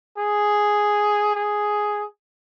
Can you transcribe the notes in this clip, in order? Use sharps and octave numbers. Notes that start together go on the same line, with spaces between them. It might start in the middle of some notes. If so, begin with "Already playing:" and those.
G#4
G#4